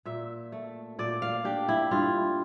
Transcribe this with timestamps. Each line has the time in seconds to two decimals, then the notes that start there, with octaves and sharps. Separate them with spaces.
0.05 A#2 E5
0.52 A3
0.99 A#2 D5
1.22 F5
1.44 D4 G4
1.69 E4
1.91 G2 F4